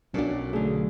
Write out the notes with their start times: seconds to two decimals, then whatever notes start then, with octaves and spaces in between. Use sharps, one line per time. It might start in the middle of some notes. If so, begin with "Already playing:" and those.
0.14 B1 A#2 F#3 C#4 D4 A4
0.53 D3 A3 G#4